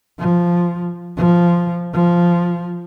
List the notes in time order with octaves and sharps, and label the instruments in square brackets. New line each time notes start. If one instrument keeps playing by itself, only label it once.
[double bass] F3
F3
F3